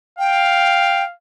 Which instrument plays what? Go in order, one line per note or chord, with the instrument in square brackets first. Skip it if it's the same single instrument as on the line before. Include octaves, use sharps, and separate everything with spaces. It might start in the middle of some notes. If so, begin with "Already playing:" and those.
[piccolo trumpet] F5 [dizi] G5